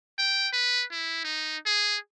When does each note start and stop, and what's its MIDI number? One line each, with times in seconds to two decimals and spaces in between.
0.18 0.48 79
0.53 0.84 71
0.92 1.23 64
1.24 1.57 63
1.66 1.96 68